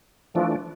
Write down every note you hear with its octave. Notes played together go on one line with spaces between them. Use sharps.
E3 F3 A3 D4